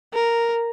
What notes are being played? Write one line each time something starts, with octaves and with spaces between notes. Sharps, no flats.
A#4